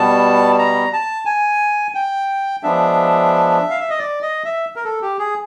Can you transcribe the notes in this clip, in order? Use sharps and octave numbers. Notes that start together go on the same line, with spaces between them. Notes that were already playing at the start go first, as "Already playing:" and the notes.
Already playing: B2 G3 B3 A5
A#5
A5
G#5
G5
F3 G#3 B3 D4 E5
F5
E5
D#5
D5
D#5
E5
A#4
A4
G4
G#4